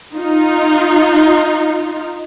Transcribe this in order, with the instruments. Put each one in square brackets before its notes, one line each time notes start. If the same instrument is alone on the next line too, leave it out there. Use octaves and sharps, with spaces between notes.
[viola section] D#4 F4